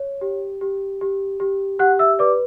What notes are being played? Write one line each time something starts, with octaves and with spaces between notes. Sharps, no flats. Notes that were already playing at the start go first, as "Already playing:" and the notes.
Already playing: C#5
G4
G4
G4
G4
G4 F#5 F#6
E5 E6
B4 D5 D6